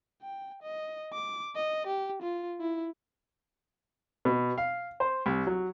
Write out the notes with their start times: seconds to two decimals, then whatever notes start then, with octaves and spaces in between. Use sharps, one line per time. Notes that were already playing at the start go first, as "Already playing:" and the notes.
0.22 G5
0.63 D#5
1.13 D6
1.56 D#5
1.87 G4
2.22 F4
2.60 E4
4.25 B2
4.58 F5
5.00 C5
5.26 C2
5.47 F#3